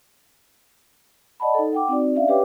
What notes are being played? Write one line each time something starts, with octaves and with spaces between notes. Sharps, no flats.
D5 D#5 F#5 A5 B5
D#4 A4
F#5 G5 D6
C4 D#4 F#4 D5
C#4 D4 D5 E5 F5
G4 B4 C#5 G5 D6